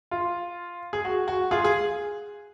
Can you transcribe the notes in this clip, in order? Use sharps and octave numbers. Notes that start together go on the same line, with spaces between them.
F4
G#4
F#4
F#4
F4 G#4
G#4